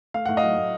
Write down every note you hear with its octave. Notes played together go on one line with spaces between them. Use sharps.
A3 F5
A2 F#5
D#5 F5
F#3
A2